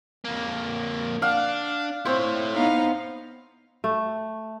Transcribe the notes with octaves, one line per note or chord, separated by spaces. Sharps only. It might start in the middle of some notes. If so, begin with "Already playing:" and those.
F2 A#3
D4 F5 F#5
C4 E4 C5 C#5
B3 D#4 F5
A3